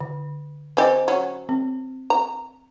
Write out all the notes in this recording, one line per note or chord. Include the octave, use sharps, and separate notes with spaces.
D3
C4 G4 C5 D#5 G#5
F#3 C#4
C4
A#5